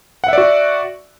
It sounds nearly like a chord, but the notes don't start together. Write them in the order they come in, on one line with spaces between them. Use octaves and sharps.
F#5 E5 D5 F#4